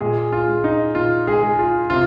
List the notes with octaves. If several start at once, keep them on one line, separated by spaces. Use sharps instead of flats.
A#2 G#3 G#4
F4
G#3
D#4
A#2 F4
G#3 G#4
G#3
F4
C3 F4